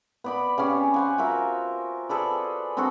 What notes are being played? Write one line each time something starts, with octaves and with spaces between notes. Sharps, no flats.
B3 D5 B5
C#3 B3 C#4 G4
C5 F#5 G#5
F4 F#4 A#4 E5
G#4 A4 B4 D5
C4 D4 F#4 A4